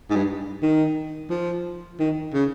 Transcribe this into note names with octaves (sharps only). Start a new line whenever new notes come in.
G#2
G2
D#3
F3
D#3
C#3